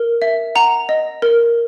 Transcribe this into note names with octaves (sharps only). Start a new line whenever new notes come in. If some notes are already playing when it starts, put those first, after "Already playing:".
Already playing: A#4
E5
F#5 A#5
D#5
A#4